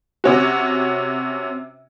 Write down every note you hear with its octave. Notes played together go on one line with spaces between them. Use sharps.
C3 C#4 F#4